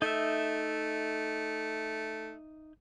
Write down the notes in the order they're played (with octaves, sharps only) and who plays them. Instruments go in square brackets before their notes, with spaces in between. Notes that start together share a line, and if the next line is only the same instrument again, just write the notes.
[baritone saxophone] A3 [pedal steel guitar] D#4 E5